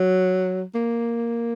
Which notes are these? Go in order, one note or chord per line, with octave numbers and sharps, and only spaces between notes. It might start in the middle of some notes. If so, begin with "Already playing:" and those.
Already playing: F#3
A#3